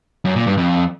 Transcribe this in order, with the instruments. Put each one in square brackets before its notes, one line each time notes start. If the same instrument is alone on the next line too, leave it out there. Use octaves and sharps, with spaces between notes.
[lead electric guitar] F#2
A#2
G2
F2